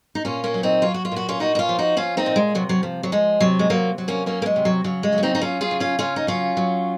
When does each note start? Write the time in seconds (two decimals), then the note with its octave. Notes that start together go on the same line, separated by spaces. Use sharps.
0.15 D#4
0.25 A#2 C#4 F4
0.44 A#3 C#4
0.54 F#3
0.63 C4 D#4
0.82 F#3 F4
0.94 F#4
1.05 F4
1.12 A#2 F#4
1.29 C#4 F4
1.39 A#2 D#4 F#4
1.55 D#4
1.59 C#4 F4
1.69 F3
1.79 D#4 F#4
1.97 F3 C#4 F4
2.17 C4 D#4
2.26 A#2
2.36 G#3
2.55 C3 F#3
2.69 F#3
2.83 F3
3.03 F#3
3.12 F3 G#3
3.40 C3 F#3
3.59 G#3
3.70 C3 F#3 A#3
3.98 F#3
4.08 A#3 C#4
4.26 F#3 A#3 C#4
4.42 A#3
4.46 G#3
4.56 C3
4.65 F#3
4.84 C#3 F#3
5.03 G#3
5.13 F#3
5.18 C#4
5.23 C4 D#4
5.35 D#4
5.41 F#3 C#4 F4
5.61 F4 G#4
5.71 C#3
5.80 C#4 F4
5.99 C#3 C#4 F4
6.16 D#4
6.27 F#3 C#4 F4
6.57 F#3